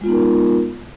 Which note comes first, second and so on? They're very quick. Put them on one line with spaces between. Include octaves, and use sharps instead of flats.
G#3 F4 B3 D#4 A#4